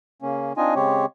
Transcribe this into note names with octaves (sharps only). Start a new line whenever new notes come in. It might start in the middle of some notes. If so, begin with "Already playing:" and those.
C#3 A#3 C#4
C4 D4 D#4 F4 D#5 G#5
C#3 G#3 C4 G4 C#5